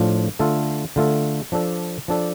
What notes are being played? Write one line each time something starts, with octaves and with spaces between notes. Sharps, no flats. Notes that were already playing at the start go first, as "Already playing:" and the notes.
Already playing: A2 F3 D4 F4
D3 A3 F4 A4
D3 A3 F4 A4
F3 D4 A4 D5
F3 D4 A4 D5